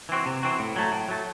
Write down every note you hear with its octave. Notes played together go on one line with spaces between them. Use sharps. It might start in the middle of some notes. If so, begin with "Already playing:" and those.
E3 C4 F#4
C3
E3 C4 F#4
A2
F#3 A3
A2
F#3 A3